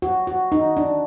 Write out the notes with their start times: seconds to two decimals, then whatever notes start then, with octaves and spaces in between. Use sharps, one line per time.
0.02 F#4
0.27 F#4
0.52 D#4
0.77 D4